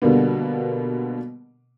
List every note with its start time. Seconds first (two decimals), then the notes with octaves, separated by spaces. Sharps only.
0.02 B2 D3 G3 A#3 B3